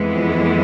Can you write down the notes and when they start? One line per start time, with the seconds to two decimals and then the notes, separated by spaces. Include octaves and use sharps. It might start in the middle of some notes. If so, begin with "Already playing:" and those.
Already playing: F2 E3 G#3 B3